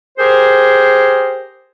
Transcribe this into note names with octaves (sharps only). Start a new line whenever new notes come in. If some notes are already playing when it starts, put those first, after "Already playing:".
G4 G#4 A#4 C5